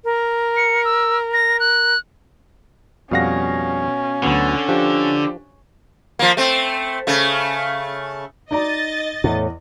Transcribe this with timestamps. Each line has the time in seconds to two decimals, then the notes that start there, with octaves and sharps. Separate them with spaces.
0.04 A#4
0.57 C#7
0.85 E6
1.33 A#6
1.60 F#6
3.11 F2 B2 G3 C#4 F5 F#5 A#6
4.23 D2 D3 F#3 B3
4.69 F3 D4 G4
6.19 F3 A#3
6.37 A3 C4
7.07 C#3 A3
8.51 D#4 D5 D#5 A#5 A6
9.24 E2 A2